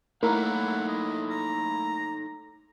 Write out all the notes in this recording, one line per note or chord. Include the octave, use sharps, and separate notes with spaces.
A3 A#3 D#4 E4 A4 A#4 C#5 F#5
D#5
A#5